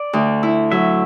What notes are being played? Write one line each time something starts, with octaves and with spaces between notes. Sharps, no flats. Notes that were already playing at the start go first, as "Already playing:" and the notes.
Already playing: D5
D2
E4
F#3 E5